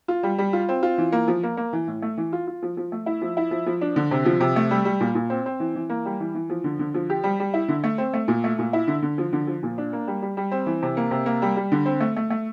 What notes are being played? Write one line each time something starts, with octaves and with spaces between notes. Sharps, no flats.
F4
G3
G3
F4
C4
F4
E3
A#3
F3
A#3
A#3
E3
A2
A3
E3
F4
F4
F3
F3
A3
E4
F3
E4
F3
F3
D4
D3
C3
F3
C3
A3
G3
G3
A#2
A#2
C4
C4
E3
E3
A#3
G3
E3
E3
F3
D3
D3
F3
G4
G3
G3
E4
D3
A3
C4
A3
A#2
A3
A#2
E4
D3
D3
F3
D3
F3
A#2
D4
A#3
G3
G3
G3
C4
E3
C3
A#3
C3
A#3
G3
G3
D3
C4
A3
A3
A3